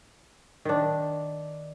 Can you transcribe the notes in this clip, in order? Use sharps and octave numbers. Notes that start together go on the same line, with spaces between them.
D#3 D4